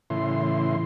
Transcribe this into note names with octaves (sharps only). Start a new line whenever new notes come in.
A2 C#3 E3 E4 C6